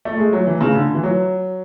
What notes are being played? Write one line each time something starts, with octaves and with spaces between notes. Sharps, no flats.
A3
G#3
F#3
E3
C#3
D3
E3
F#3